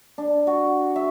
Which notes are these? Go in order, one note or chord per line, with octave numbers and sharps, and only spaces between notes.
D4
F#4
E5